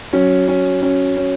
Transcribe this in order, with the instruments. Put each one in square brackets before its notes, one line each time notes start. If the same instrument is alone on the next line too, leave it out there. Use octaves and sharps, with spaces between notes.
[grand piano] F#3 [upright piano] C#4
[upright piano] C#4
C#4
C#4